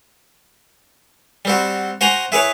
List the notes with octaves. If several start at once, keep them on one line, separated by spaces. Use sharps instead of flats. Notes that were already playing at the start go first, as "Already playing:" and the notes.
G3 C4 F#4
F#4 C5 G#5 A#5
E4 G#4 B4 C#5